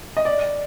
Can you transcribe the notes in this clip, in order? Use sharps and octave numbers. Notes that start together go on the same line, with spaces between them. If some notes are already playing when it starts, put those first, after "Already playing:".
D#5
D5